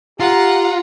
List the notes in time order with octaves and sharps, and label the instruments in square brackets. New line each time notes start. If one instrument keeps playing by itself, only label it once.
[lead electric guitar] F4 [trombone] G4 [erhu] F#5 [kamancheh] A#5